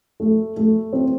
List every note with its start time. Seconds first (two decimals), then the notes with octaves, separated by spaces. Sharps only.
0.20 A3
0.57 A3
0.93 C4